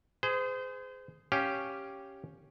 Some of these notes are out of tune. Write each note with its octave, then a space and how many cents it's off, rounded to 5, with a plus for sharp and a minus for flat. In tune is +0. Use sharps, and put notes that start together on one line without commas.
G#4 +0 C5 -35
C#4 +0 G4 +0 F5 +0